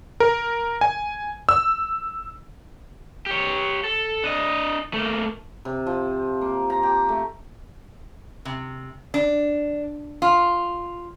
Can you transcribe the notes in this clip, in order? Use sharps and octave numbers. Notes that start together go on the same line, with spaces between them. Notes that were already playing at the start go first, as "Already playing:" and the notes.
A#4
G#5
E6
G4 C#5
A4
D4 D#5
A3 A#3
C3
F3
A#3
A#5
G4
A3
C3
D4
F4